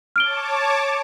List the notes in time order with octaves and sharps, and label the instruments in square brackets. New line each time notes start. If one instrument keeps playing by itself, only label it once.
[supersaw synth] C#5 A5 D6 [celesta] F6 D7 G7